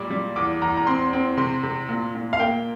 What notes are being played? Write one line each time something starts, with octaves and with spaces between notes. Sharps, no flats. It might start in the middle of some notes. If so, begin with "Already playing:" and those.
Already playing: A#2 G3 D6
G3
E2 D6
E2 A#5
A#5
C4 C6
C4
C3 C6
C3
A#2
A#2
F5
A#3 G5